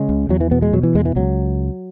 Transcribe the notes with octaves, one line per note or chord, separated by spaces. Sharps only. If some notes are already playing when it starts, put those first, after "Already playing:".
Already playing: C#3 G#3
C#2
E2 F#3
E3
B2 B3
G#3
B2 F#3
E3
E2 G#3
E3
C#2 F#3